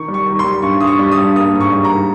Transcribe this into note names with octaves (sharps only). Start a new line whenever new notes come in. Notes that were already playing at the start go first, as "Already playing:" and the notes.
Already playing: D#3 C#6
G3
C#6
D#3
C6
G3
G2 C#6
G2 D#6
C#6
G3
D#6
G2
A#3 D#6
G#2
C#6
G3
A#5
D#3